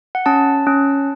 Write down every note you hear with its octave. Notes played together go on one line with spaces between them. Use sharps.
F#5
C#4 A5
C#4